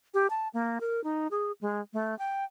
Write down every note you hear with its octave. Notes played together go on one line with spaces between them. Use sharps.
G4
A5
A#3
A#4
D#4
G#4
G#3
A3
G5